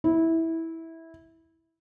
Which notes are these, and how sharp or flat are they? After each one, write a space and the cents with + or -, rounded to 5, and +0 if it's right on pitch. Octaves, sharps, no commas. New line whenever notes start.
E4 -15